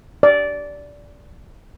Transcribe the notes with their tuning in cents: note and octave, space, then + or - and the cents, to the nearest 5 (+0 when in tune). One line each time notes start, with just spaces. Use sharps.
D5 -15